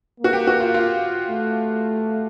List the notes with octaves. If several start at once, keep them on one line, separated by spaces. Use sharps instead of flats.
A#3 F#4
G4
F#4
F4
F4
A3